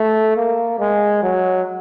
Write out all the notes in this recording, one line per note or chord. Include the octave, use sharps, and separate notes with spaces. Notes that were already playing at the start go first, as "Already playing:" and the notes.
Already playing: A3
A#3
G#3
F#3